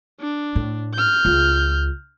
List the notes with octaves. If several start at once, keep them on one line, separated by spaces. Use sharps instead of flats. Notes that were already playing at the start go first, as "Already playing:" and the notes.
D4
A2
F6 G6
C#2 F4